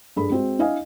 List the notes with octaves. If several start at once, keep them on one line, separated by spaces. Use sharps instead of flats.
G2 G#4 A4 B5
G#3 C4 F#4
D4 E4 D#5 F5 G#5